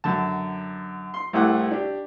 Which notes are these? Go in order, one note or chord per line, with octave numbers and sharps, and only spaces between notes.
F#2 D3 A5
C6
C2 A2 A3 F#5 D6 F#6
D4 G4